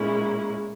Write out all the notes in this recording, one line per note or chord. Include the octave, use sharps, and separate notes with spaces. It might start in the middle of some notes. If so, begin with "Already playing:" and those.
Already playing: A#2 G#3 C#4 E4